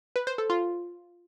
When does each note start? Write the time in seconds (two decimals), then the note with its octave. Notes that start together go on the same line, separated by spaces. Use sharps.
0.16 B4
0.27 C5
0.38 A4
0.50 F4